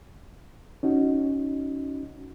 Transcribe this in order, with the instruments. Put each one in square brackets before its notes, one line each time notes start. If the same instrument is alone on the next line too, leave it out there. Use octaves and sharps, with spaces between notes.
[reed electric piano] C#4 D#4 F#4